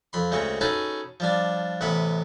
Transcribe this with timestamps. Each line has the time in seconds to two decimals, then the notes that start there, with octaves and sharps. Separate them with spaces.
0.13 F2 B5 C6
0.31 D2 C#3 G#3 C4 C#6
0.61 C#4 D#4 F#4 G#4 A4 B4
1.20 F3 G3 D4
1.81 A1 C3 B3 F#5 B5